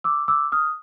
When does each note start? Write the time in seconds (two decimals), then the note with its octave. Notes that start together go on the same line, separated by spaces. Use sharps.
0.04 D6 E6
0.28 D6 E6
0.52 D#6 F6